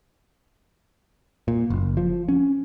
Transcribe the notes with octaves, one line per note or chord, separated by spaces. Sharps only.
A#2
F#1
F3
C#4